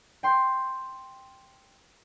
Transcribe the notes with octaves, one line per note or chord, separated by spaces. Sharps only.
G5 C6